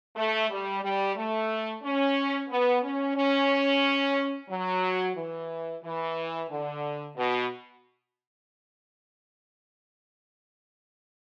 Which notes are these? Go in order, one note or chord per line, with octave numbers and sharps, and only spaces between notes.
A3
G3
G3
A3
C#4
B3
C#4
C#4
F#3
E3
E3
D3
B2